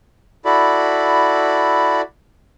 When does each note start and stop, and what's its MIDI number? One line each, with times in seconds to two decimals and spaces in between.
0.45 2.01 64
0.45 2.01 66
0.45 2.01 69
0.45 2.01 74
0.45 2.01 83